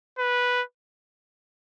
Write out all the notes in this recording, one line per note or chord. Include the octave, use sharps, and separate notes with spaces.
B4